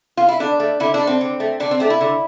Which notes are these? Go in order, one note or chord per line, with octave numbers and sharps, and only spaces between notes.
F4
E4
D3 D4
A3
D3 E4
D4
A3
C4
D3
A3
D3 D4
C4
A3 D4
E4
D3